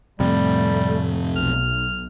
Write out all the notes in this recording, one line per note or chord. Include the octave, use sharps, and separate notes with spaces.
F2 A2 C3 G3 A3
B1 F6